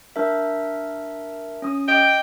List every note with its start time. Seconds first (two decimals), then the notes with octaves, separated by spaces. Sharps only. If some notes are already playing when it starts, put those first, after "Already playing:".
0.16 D4 A#4 E5
1.62 C#4 D#6
1.88 D#5 G5 D6